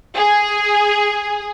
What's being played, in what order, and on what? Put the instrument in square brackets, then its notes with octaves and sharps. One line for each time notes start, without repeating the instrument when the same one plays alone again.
[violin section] G#4